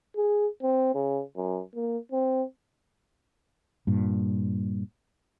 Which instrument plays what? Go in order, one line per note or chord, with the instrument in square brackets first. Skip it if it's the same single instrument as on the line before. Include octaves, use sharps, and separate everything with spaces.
[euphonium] G#4
C4
C#3
F#2
A#3
C4
[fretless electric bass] G2 A#2